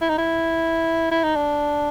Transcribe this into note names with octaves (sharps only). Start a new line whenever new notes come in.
E4
D#4
E4
E4
D#4
D4